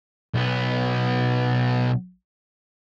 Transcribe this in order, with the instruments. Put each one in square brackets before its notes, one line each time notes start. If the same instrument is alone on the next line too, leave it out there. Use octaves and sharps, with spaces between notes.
[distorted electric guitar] B1 B3